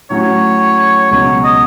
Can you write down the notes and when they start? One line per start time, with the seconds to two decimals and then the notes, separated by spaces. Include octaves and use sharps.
0.10 A2 F#3 C#4 F#4 C#5
1.11 C#2 B2 F#3 C#4 C#5
1.44 D#5